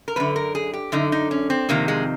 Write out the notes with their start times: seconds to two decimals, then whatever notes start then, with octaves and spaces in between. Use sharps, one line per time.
0.08 A#4
0.16 F#2 D3 B4
0.36 A#4
0.55 G#4
0.73 G4
0.92 F#2 D3 D#4
1.12 D#4
1.31 C#4
1.50 C4
1.69 F2 C3 D#3 A#3
1.88 G#3